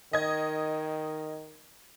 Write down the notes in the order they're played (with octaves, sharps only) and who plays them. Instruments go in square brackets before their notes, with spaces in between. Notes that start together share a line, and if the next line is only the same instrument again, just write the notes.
[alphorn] D#3 [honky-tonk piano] D#5 G#6